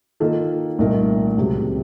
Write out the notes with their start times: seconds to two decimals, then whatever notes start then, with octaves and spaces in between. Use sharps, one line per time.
0.20 D#3 A#3 F4 A4
0.79 C2 A#2 A3 D#4 A#4
1.37 C#2 C3 F#3